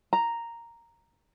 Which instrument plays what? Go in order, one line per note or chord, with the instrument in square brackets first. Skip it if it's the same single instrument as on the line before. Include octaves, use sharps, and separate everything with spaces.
[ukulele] A#5